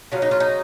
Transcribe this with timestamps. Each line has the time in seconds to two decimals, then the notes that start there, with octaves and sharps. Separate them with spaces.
0.12 C#3 F#3 C#4 F4
0.22 D#4
0.31 F4
0.40 D#4